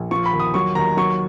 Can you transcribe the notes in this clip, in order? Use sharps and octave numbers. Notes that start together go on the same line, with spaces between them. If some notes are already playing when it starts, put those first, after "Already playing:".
Already playing: A#1
F3 C#6
B5
D#2
D#6
F#3 C#6
D#2 A#5
F#3 C#6